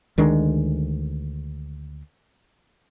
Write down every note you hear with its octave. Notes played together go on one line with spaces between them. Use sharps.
D2 D#3 G#3 D4